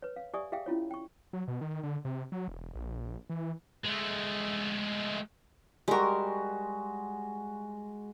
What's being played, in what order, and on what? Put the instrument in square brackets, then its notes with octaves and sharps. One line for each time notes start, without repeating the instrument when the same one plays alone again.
[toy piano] B4 C#5
F5
G4 D5 E5 G#5 C#6 D#6
G4 G#4 E5 F5 G5
C#4 E4 F4 C#5
G5 C#6
[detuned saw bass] F#3
B2
D#3
D3
C3
F#3
E1
A#1
E3
[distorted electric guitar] G#3 A3
[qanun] G3 A#4 [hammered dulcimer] G#3 F#4